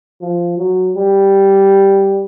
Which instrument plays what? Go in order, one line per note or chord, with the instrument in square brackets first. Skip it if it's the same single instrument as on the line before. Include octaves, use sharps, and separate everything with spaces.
[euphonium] F3
F#3
G3